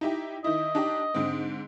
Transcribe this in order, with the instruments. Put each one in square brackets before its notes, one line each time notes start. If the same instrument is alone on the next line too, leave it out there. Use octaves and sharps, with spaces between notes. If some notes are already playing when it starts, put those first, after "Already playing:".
[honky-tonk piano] D#4 E4 G4
[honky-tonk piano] D#3 E4 [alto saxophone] D#5
[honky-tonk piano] D4 D#4 G4
G#2 D3 C4